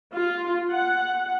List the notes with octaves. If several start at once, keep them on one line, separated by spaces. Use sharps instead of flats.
F4
F#5